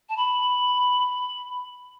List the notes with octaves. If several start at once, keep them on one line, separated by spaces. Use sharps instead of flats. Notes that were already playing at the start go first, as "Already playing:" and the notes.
A5
B5